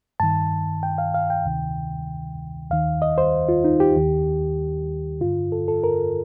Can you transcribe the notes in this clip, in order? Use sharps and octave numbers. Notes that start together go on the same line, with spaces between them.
G2 D#3 A5
G5
F5
F5
G5
D2 C3 D#3
D#2 D#3 F5
D#5
C5
F4
D#4
G4
D#2 D#3
G2 D3 F4
A4
A4
A#4